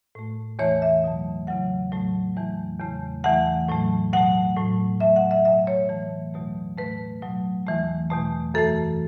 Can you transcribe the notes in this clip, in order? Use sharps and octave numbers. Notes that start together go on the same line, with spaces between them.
A2 A3
E2 E3 A3 C#5
E5
B2 F#3 A3
E2 C#3 F#3 F#5
A2 F#3 A3
E2 E3 A3
E2 C#3 A3
E2 E3 A3 F#5
A2 F#3 A3
B2 F#3 A3 F#5
A2 F#3 A3
A2 F#3 A3 E5
F#5
E5
B2 F#3 A3 E5
C#5
A2 E3 A3
E2 B2 F#3 A3
A2 A3 B4
B2 F#3 A3
E2 E3 A3
E2 B2 A3
F#2 E3 A3 A4